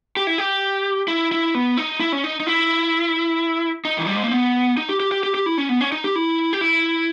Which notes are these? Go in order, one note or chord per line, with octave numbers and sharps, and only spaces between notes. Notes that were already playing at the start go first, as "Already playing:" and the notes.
G4
E4
G4
E4
E4
B3
D#4
E4
C#4
D#4
D#4
E4
D#4
E3
G3
G#3
A#3
B3
D#4
G4
G4
G4
G4
G4
E4
C#4
B3
C#4
D#4
G4
E4
G4
E4